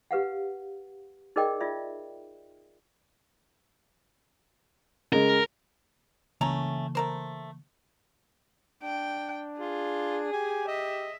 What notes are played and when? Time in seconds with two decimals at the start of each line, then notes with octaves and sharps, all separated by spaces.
0.11 G4 B4 F5 F#5
1.36 D#4 G#4 A#4 D5 D#5 G5
1.61 F4 D5 E5
5.13 C#3 G#3 A#4
6.41 C#3 E3 A3 A#3 C#4 A#5
6.95 A3 A#4 C5
8.83 D4 G5
9.59 F4 G#4
10.33 G4 G#5
10.68 D#5 E5